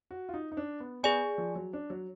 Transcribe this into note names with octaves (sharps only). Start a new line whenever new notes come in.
F#4
F4
D#4
D#4
D4
B3
B3 G#4 D5 G#5
F3
F#3
D4
F#3